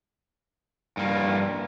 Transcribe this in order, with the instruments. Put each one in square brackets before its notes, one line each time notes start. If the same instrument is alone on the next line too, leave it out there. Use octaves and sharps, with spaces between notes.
[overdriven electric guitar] G2 A#3